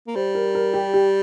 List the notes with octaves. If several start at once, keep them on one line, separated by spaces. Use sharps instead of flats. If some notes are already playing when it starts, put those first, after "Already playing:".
A#3
G3 C5
A#4
A#4
G4
G4